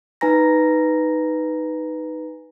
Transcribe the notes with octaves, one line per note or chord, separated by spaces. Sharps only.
D#4 B4 G#5 A#5 A#6